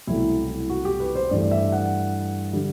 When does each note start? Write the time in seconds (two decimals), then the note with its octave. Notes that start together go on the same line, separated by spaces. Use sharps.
0.07 C2 B2 F#3 A3 E4
0.70 F#4
0.85 G4
1.00 B4
1.15 C5
1.30 G2 E3 A3 D5
1.51 E5
1.72 F#5
2.53 D3 G3